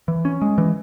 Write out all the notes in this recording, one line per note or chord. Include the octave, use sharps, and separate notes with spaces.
E3
C#4
G#3
E3